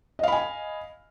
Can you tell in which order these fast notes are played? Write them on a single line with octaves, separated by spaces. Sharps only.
D#5 F5 B5 G#5